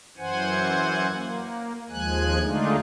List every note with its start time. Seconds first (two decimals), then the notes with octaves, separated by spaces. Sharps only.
0.18 F#2 E3 C5 F#5 G#5
1.12 A#3
1.89 D#2 F3 G#3 G#5 F#6
2.41 D3 G#3 A3 D4 D#4 F4